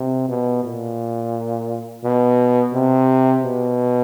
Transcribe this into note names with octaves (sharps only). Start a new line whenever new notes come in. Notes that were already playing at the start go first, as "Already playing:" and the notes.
Already playing: C3
B2
A#2
B2
C3
B2